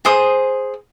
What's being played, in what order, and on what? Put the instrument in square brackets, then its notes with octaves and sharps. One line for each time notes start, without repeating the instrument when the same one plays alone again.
[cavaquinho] G#4 C5 D#6